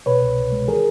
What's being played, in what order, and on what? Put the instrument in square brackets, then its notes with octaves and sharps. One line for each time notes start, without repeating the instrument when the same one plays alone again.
[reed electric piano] B2 B4 C#5
C2
C2
G#3
D#3 G#4 A#4